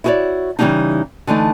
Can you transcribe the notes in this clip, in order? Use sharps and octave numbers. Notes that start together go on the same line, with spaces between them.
E4 F#4 G#4 B4 C#5 D5
C#3 E3 G3 A#3 D4 D#4
D3 E3 A3 D#4